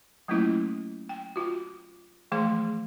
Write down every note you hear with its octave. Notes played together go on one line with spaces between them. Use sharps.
F#3 A3 A#3 C#4 E4 F4
G5
F4 F#4
E3 F3 G#3 A3 G#4 C6